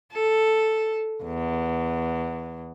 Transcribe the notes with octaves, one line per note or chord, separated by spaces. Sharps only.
A4
E2